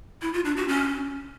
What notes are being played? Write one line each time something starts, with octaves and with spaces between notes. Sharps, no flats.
E4
F4
D4
F#4
C#4